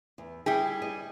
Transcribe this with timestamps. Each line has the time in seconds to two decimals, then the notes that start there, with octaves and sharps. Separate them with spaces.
0.18 E2
0.46 G3 E4 G#4 G5
0.82 D#5